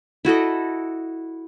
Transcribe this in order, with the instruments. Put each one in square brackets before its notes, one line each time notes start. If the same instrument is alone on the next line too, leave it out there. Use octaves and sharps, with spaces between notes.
[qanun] E4 F#4 A4 D#5